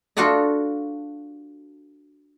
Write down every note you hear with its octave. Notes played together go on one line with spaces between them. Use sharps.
D4 F4 F#4 A4 D5 D#5